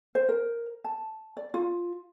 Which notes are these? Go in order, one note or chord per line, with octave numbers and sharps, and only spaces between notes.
C5
A#4
A5
D5
F4